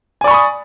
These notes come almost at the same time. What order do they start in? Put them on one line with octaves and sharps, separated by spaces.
G#5 D5 C#6 B5 D#6